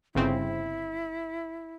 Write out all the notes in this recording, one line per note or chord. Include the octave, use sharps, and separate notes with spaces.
G1 C#3 C4 E4